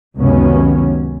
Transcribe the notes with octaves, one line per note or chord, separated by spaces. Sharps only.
C#2 F#2 C3 D#3 B3 C#4